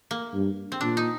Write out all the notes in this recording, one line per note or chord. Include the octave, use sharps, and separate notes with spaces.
A#3
G2
C4
A#2 D4
D#4